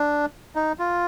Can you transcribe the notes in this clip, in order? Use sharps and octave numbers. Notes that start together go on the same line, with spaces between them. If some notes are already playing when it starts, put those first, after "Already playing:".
Already playing: D4
D#4
F4